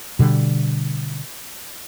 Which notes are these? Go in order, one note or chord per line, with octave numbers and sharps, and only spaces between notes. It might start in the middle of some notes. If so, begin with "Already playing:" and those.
B2 D3 G3